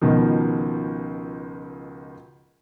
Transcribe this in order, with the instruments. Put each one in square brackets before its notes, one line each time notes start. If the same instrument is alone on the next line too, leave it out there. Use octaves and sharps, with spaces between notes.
[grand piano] C#2 B2 D#3 F3